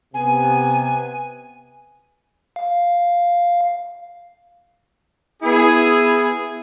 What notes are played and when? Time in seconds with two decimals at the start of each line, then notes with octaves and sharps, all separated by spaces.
0.14 C3 B3 G#5
2.56 F5
5.43 B3 E4 G#4